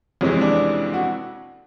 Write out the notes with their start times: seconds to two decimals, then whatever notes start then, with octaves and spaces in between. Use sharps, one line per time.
0.21 F2 C3 E3 G#3 C#4
0.41 D4
0.93 F#4